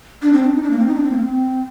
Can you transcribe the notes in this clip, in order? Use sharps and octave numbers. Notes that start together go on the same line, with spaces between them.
D4
C4
D4
D#4
D4
A#3
C4
D#4
D4
C4
A#3
C4